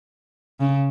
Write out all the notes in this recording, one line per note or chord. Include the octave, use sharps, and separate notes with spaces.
C#3